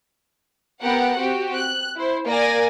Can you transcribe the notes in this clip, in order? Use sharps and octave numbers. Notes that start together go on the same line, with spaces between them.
B3 G4 A#4 F#5
C4 F#4 G4
F#6
E4 C5
A#3 D5 G#5 A#6